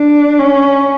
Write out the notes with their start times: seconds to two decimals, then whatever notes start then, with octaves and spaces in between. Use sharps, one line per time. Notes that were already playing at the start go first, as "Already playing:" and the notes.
Already playing: D4
0.39 C#4